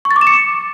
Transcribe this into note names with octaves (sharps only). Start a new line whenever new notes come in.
C#6
A6
D6
E7
C#7